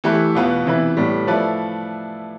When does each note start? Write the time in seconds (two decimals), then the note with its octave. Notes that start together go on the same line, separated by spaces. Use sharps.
0.04 E3 A3 E4 G4 B4
0.35 E2 B2 B3 F4 B4
0.66 C3 E3 B3 E4 B4
0.97 A2 G3 B3
1.27 F3 A3 E4 B4 D5